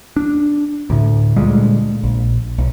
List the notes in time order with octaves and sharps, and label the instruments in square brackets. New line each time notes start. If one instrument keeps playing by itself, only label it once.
[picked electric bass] D4
D2 A2
D2 A#2 G3 G#3
A#1
B1